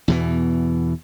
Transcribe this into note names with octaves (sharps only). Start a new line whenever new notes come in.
E2 B2 E3